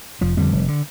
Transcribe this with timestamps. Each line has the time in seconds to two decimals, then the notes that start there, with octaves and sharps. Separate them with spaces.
0.21 F1 F3
0.37 F2 D3 G3
0.52 F1
0.68 D3